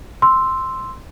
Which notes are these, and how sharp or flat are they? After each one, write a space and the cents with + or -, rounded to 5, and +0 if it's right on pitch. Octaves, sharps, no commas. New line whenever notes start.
C6 +0 E6 +0